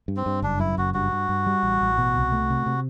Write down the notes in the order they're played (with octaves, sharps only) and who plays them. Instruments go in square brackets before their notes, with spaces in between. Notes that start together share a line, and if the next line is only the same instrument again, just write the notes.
[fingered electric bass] G2
[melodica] C4
[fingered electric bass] G2
[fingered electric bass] F#1 [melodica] D4
[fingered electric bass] F#2 [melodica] E4
[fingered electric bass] F#1 [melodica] F#4
[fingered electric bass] G2 [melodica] F#4
[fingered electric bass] G2
G2
G3
A1
A1
B2
C2
A3
C3
C3